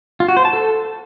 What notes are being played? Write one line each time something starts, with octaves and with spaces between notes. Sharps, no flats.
F4
F#4
C5
A5
A4